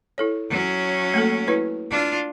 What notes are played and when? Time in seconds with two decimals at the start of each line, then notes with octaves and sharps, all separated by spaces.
0.18 E4 A4 C#5
0.50 F#3 C#4
1.14 A3 A#3 A4
1.47 E4 B4 C#5
1.90 D4 F4